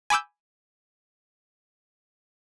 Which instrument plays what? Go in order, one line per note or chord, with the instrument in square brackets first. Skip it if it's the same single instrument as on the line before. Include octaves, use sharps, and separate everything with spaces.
[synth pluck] G#5 B5 D6 E6 G6